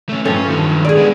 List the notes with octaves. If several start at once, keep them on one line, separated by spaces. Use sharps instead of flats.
A3 C#4
G2 F3 C#4 A4
D#3 F#3
G#4 D5
G#3 B3